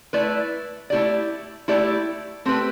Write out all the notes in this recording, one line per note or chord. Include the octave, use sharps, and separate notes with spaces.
A3 E4 B4 D5
A3 E4 G4 D5
A3 E4 G4 D5
A3 C4 G4 B4